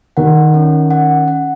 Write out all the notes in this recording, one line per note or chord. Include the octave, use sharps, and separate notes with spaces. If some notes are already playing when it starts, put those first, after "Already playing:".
D#3 F#5
C#4
F#5
F#5